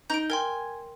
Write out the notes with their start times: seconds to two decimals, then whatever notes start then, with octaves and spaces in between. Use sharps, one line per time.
0.10 D#4 G6 D7
0.30 A#4 G5 G#5 C6